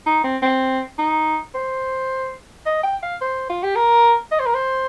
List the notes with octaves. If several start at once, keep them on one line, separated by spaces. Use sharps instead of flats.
D#4
C4
C4
D#4
C5
D#5
G5
F5
C5
F4
G4
A#4
D#5
C5
A#4
C5